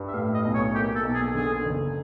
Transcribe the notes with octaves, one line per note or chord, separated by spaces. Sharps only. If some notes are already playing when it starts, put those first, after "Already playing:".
Already playing: G2
E5
A2 F5
D#5
B1
C#5
A#3 G4
A4
B1
G#4
D3 G#4
F#1